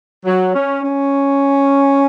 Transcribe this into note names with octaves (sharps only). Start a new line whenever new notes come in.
F#3
C#4
C#4